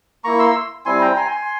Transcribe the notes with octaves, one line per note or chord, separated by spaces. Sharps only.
A#3 E4 A#5 C#6
C6 E6
G3 C4 E4 G#5 C6
G5 A#5
G#5 C6
G#5 C6